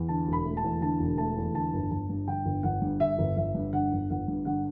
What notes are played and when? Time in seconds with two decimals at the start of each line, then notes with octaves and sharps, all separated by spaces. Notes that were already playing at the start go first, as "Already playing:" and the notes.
Already playing: E2
0.08 D3 A5
0.28 E1 B5
0.45 A3
0.57 A5
0.64 E2
0.81 D3 A5
1.00 E1
1.18 A3 A5
1.37 E2
1.54 D3 A5
1.73 G1
1.90 G1 A5
2.09 G2
2.28 D3 G5
2.45 G1
2.63 G1 F#5
2.81 G2
3.00 D3 E5
3.18 G1
3.37 G1 E5
3.54 G2
3.73 D3 F#5
3.92 G1
4.10 G1 F#5
4.28 G2
4.45 D3 F#5